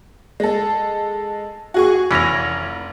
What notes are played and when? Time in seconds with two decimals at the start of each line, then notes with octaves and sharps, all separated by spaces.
0.40 G#3 A4
1.74 F#4 G#4 C#6
2.11 F1 E3 C#4 A#6 F7